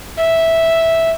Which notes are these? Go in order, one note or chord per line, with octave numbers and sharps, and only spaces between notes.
E5